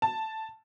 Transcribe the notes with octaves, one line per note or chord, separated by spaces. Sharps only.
A5